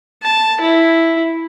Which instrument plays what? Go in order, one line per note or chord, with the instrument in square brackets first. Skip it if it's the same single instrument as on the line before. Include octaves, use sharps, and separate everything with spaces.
[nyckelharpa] A5
E4